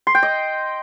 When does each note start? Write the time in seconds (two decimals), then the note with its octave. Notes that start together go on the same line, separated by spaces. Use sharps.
0.07 C6
0.15 G5
0.23 D#5